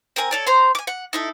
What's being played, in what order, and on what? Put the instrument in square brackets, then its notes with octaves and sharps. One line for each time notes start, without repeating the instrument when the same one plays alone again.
[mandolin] C4 A#4 G#5 A#5
A4 C#5 D5
C5 A#5 C6
G#5 D6
F#5
D#4 E4 A4